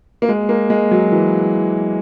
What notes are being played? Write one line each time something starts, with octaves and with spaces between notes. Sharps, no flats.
A#3
G#3
A#3
G#3
F#3
E3